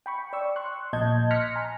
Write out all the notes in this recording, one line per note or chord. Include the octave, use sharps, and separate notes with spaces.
G5 B5 C#6
D5 C#6 E6
C6 C#6 F#6
A#1 A#2 D#5 A5 G6 G#6
C6 F6 F#6 A#6 B6 C#7
G#5 A#5